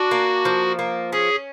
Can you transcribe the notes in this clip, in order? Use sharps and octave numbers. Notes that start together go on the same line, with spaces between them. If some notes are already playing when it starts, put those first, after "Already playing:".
Already playing: D4 F#4
A#3
F3
A#3
C#4 G#4